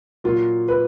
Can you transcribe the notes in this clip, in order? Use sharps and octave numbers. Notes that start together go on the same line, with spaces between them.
A#2 F#3 A#3 F4
B4